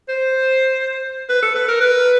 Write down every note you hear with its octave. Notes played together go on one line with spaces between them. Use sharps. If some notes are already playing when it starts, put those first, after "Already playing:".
C5
B4
A4
B4
A#4
B4